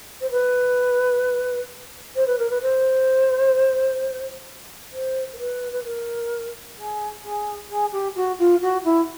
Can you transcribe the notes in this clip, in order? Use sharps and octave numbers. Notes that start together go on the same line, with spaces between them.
C5
B4
C5
B4
A#4
B4
C5
C5
A#4
B4
B4
A#4
G#4
G#4
G#4
G4
F#4
F4
F#4
E4